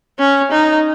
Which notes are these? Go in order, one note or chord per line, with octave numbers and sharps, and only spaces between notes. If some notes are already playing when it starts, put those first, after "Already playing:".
C#4
D#4